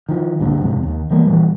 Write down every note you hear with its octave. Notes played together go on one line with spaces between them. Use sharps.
D#3 F3
C#2 G2 A#2 D3
F2 G#2 C3
D#2
E3 G3 A#3
A#2 E3 G3